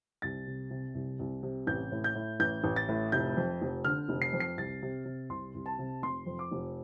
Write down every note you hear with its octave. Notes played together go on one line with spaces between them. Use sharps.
C2 A6
C3
C3
C2
C2
C3
A1 G6
A2
G6
A2
A1 G6
A1
A6
A2
F1 G6
F2
F1
D3 F6
F1
C7
F2
C7
C2 A6
C3
C3
C2 C6
C2
A5
C3
F1 C6
F2
D6
F1